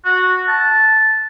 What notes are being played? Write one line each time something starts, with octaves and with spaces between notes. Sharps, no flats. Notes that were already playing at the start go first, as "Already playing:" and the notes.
F#4
A5